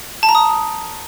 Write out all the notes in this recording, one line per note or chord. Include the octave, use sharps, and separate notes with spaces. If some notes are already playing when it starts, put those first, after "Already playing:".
A5
A#5
D#6